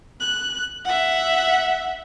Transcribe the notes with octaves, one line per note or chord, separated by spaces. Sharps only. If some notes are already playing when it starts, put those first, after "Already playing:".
F#6
E5 F#5